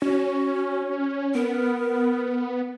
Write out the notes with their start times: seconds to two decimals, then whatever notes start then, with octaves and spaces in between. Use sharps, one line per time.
0.02 C#4 F#4
1.35 B3 A#4